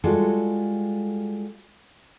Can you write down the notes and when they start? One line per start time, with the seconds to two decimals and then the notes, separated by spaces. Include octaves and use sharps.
0.04 G3 G#3 F4 F#4 A4